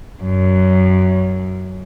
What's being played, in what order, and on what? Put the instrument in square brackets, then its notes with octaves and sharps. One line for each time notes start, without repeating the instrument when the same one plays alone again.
[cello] F#2